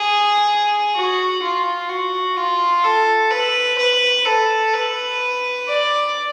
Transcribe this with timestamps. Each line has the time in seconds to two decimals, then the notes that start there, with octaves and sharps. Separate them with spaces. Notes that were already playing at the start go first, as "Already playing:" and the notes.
Already playing: G#4
0.95 F#4
1.42 F4
1.89 F#4
2.37 F4
2.84 A4
3.31 B4
3.78 B4
4.25 A4
4.73 B4
5.67 D5